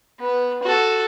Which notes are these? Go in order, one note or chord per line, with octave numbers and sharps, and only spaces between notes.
B3
F#4 A4